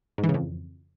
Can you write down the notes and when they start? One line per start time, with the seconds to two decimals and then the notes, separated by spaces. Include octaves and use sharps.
0.18 G#2
0.24 E3
0.29 C#3
0.34 F2